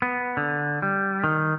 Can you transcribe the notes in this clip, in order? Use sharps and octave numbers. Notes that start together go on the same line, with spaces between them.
B3
D3
G3
D#3